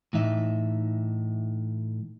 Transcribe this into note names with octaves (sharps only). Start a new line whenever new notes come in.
A2 E3 D#4 E5